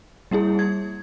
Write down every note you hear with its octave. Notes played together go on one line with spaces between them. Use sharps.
G3 A#3 E4 G#4
G#6